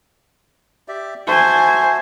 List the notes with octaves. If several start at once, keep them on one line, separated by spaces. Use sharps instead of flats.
G4 D5 E5
F#4 C5 E5 G#5 A5